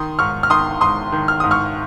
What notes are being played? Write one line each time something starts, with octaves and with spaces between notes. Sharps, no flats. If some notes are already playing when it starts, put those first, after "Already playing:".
Already playing: D#3 C6 D#6
G#2 C#6 F6
F6
D#3 C6 D#6
G#2 C6 D#6
D#3
F6
G#2 D#6
C#6 F6